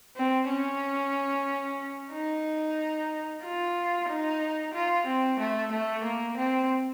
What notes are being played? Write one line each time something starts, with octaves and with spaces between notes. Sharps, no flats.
C4
C#4
D#4
F4
D#4
F4
C4
A3
A3
A#3
C4